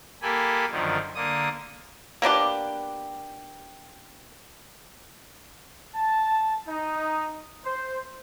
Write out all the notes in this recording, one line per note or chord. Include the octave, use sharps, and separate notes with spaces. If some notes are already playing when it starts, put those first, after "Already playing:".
A#3 G4 A4 G#5 B5
F#2 D3 D#3 F3
D3 A#3 D#6
A#3 B3 D4 G4
A5
D#4
C5